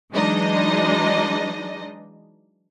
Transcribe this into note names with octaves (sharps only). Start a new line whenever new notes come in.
E3 F#3 G#3 D4 D#4 D#5